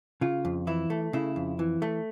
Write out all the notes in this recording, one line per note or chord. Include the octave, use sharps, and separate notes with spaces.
C#3 F4
F2
E3 E4
A3
C#3 E4
F2
E3
A3